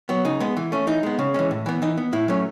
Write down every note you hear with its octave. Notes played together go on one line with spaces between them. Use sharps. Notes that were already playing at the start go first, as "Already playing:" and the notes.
F#3 B3
C#3 D#4
G#3 B3
E3
A3 C#4
E3 D#4
G#3 B3
C#3
E3 G#3 C#4
A2
E3 B3
E3 D#4
B3
A2 E4
F#3 A3 C#4